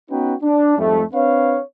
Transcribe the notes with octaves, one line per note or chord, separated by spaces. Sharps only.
B3 C#4 D#4 F#4 B4 G5
D4
F2 G#2 G3 A3
C4 D4 B4 C#5 F5